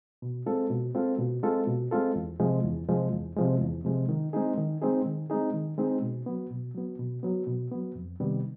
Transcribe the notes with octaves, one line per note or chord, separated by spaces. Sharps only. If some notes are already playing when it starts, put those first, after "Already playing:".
B2
G#3 C4 F4 A4
B2
G#3 C4 F4 A4
B2
G#3 C4 F4 A4
B2
G#3 C4 F4 A4
E2
C3 F3 G#3
E2
C3 F3 G#3
E2
C3 F3 G#3
E2
C3 F3 G#3
D#3
G#3 C4 D#4 G#4
D#3
G#3 C4 D#4 G#4
D#3
G#3 C4 D#4 G#4
D#3
G#3 C4 D#4 G#4
B2
F#3 B3
B2
F#3 B3
B2
F#3 B3
B2
F#3 B3
F2
C3 D#3 G3 B3